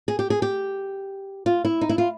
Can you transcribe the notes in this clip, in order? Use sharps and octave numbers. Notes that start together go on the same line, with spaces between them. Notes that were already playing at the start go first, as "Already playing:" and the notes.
G#4
G4
G#4
G4
F4
E4
D#4
E4
F4